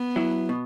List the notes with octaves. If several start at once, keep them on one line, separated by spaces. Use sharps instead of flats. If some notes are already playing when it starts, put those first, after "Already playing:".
Already playing: B3
F#3 E4
B2